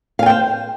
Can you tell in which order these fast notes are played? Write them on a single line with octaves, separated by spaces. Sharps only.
F5 G#5 G5 C5